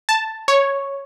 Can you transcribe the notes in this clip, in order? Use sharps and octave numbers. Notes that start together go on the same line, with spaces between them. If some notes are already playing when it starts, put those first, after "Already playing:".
A5
C#5